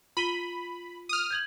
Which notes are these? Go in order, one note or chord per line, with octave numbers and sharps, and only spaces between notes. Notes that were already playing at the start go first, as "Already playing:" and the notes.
F4 B5 D#7 G7
D#6 F6
G6 G#6 F#7